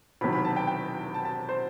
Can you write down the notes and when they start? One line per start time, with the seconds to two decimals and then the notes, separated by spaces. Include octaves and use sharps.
0.21 E1 E2 C3 D#3 F#3 B5
0.33 B5
0.45 A5
0.57 G5
0.68 G5
1.14 A5
1.25 A5
1.49 C5